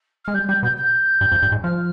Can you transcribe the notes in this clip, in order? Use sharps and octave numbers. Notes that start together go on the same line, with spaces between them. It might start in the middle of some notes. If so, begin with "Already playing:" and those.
G#3 F6
G3 G6
G3 G6
B2 G6
G6
G2
F2
G2
G#2
F3 F6